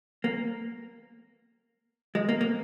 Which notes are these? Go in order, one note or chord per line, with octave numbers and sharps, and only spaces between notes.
A#3
G#3
A#3
A#3